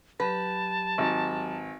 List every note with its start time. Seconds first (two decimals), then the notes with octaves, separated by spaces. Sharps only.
0.20 F#3 G4 B4 A5
0.98 G#1